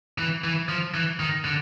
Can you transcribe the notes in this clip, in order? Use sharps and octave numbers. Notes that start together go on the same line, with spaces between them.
E3
E3
F3
E3
D#3
D3